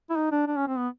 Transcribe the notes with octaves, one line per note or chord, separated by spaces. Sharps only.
E4
D#4
D4
D4
C#4
C4
B3